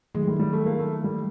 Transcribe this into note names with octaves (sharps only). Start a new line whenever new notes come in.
D#3 F#3 G#3 A3
G3
G3
A3
A#3
A3
G3